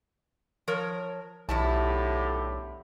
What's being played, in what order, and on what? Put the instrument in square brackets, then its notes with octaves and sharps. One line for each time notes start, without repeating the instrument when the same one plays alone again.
[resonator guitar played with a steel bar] F3 A#4 C#5
[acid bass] B1 [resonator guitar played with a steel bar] E2 E4 A5 [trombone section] A2 D3 G4